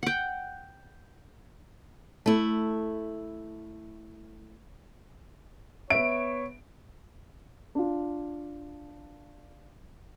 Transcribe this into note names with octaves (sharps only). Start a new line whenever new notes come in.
F#5 G5
A3 E4
B3 C#5 E5 D7
D4 F4